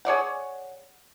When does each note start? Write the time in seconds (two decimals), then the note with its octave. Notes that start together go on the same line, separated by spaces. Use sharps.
0.05 G#4 C#5 D5 F#5